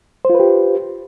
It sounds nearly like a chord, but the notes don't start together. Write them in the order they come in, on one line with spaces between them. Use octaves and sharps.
C5 F4 B4 G4